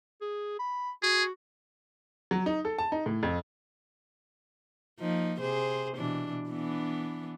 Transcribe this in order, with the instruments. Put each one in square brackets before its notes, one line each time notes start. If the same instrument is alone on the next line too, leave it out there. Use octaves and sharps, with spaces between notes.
[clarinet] G#4
B5
[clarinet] F#4 [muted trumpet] G#4
[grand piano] F#3
D#4
A4
A5
D#4
A2
F2
[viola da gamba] F3 A#3 D#4
C3 G#4 C5
B2 E3 D4
E3 B3 D4